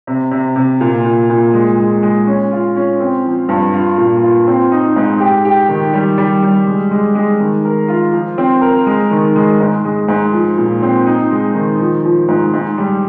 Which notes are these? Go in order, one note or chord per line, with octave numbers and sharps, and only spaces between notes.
C3
C3
C3
A#2
A#2
A#2
G#3
G#3
G#3
C#4
F4
C#4
C4
F3
G2
F4
A#2
F4
C4
D#4
G#2
G4
G4
D#3
G3
G3
G3
G#3
G#3
G#3
D#3
A#4
F4
F3
C4
A#4
G#3
D#3
G#3
G#2
G#3
G#2
F3
A#2
C4
D#4
G#3
D#3
F3
F3
G#2
G#2
G3